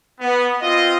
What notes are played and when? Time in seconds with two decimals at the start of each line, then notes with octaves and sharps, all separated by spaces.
0.20 B3
0.62 C4 F4 D#5